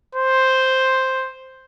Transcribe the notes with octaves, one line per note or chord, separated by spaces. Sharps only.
C5